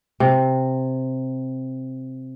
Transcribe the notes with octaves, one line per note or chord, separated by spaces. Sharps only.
C3